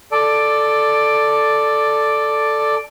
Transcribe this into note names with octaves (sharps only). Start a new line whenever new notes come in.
A4 D5